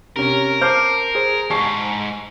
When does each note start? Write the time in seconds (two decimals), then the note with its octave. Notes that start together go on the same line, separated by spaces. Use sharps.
0.16 C3 C#4 A#4
0.61 C5 A5 D6 F6 G6 C7
1.15 G#4 C5
1.50 E2 G#2 G#5 A5 C#6 C7